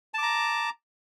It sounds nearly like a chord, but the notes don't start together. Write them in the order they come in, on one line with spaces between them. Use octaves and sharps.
A5 D6 A#5